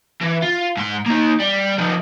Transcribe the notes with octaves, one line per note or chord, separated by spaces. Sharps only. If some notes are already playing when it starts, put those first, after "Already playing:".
E3
F4
G#2 C6
A#3 D#4
G3
F3 D#4